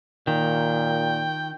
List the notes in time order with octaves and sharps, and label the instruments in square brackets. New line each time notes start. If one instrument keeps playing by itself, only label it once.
[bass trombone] A#2 [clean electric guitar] D#3 [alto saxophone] G5